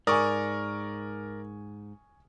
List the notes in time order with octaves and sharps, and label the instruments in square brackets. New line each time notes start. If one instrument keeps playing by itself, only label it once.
[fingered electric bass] G#2 [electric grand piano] A#4 D5 [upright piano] G#5 C#6 D#6